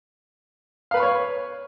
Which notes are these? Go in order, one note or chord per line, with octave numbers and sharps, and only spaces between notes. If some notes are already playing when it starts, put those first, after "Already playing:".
B4 C#5 F5 B5 C#6